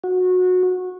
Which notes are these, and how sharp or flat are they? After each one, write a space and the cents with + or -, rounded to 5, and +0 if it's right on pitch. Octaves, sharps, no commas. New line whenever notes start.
F#4 -20